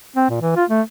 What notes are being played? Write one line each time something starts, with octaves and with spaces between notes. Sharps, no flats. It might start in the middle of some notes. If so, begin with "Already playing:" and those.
C4
A#2
E3
F4
A3